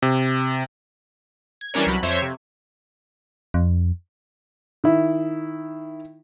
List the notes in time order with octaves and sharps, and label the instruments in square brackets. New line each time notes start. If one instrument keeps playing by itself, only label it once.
[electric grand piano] C3
[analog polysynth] G#6
E3 G3 C#4 D4 A#4 C#5
C2 F#3 B5
F2 C5 C#5 E5 G#6
C3
[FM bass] F2
[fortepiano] D#3 E4